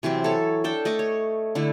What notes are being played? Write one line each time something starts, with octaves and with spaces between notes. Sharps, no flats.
C3 E3 F#3 C4
A4 C#5
D4 A4 G5
A3 D#5 C#6 D6
C#5
D3 A3 E4